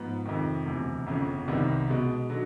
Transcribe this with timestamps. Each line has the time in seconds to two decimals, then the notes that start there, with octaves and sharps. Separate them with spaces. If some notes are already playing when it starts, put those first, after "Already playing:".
Already playing: G#2 F3 B3
0.25 F2 C3 D#3
0.65 E1 D2 C3 E3
1.06 G1 F2 C#3
1.48 C2 C3 D#3 G3 B3
1.88 B2 G#3 B3
2.30 D3 F#3